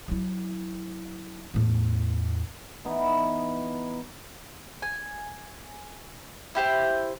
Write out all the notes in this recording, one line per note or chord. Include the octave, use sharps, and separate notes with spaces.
F#3 E4
E2 A2
E3 B3 D#4 E4
G#5
E4 G4 C5